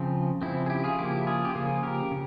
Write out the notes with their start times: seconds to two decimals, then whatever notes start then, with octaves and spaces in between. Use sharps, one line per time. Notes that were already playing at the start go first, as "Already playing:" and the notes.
Already playing: C#3 F3 C4 F4
0.42 C#3 F3 C4 E4
0.66 G#4
0.70 E4 G4
0.84 F4 G#4
0.98 C#3 F3 A#3 E4 G4
1.27 F4 G#4
1.45 G4
1.55 C#3 F3 A#3 F4 G#4
1.83 G4 A#4
2.11 C#3